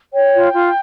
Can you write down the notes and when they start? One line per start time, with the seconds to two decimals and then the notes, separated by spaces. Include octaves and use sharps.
0.14 C#5 G5
0.34 F4
0.54 F4